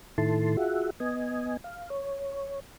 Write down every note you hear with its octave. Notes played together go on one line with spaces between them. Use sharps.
A2 D#3 E4 A4 A5 C6
F4 F#4 G#4 E5 F#5
B3 D#5 G#5
F5
C#5